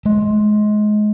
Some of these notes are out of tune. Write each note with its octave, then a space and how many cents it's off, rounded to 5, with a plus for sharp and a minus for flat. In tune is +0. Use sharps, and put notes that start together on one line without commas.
G#3 +25